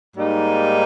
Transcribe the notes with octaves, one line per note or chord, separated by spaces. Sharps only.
G#2 G3 A#3 D#4